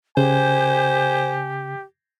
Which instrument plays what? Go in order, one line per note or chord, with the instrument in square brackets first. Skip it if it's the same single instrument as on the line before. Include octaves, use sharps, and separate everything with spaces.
[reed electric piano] C#3 [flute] G4 [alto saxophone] C5 [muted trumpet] G#5